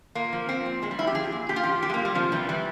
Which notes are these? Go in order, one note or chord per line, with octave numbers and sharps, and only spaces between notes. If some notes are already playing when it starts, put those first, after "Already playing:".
A#2 A#3
F3
F3 C4
A#2
A#2 G#3
G3
F3 E4
G4
F3 G#4
A#2
A#2 G4
F4
F3 G4
F3 G4
G#3
A#2 A#3
G3
C3 F3
E3 G3
E3 G3